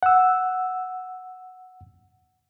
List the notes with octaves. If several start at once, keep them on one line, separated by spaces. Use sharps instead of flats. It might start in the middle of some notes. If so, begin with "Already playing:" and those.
F#5 E6